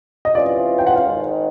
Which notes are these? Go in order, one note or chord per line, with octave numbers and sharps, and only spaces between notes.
D#5
C3 E3 G#3 C#4 F4 D5
G5
F#5
F5
G#1 G#2 D#3 G#3